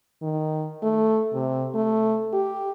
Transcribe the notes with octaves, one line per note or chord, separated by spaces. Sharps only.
D#3
A3
C3
A3
G4